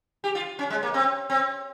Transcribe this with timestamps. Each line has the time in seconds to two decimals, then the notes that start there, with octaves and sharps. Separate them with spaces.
0.24 G4
0.35 F4
0.59 C#4
0.70 G#3
0.83 A#3
0.94 C4
1.30 C4